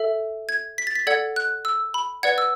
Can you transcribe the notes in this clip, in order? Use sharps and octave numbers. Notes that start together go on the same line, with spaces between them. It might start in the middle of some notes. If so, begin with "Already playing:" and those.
Already playing: A4 E5
G#6
B6
A6
B6
A4 D5 F#5 G#6
F#6
E6
B5
B4 D5 F#5 G#6
E6